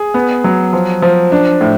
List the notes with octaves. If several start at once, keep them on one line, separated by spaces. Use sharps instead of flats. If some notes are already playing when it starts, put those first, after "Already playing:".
Already playing: G#4
B3
F#3
F3
F3
D4
A2